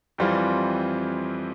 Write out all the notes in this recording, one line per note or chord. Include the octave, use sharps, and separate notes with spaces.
F2 E3 G3 C4 F4